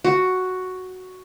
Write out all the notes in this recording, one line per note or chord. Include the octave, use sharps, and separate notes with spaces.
F#4